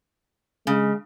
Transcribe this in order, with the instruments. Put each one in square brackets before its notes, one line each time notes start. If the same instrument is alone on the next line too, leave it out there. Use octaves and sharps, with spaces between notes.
[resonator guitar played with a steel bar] C#3 [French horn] G#3